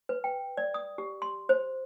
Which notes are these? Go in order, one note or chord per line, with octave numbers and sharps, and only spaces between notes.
B4
G5
D5
D#6
G4
C6
C5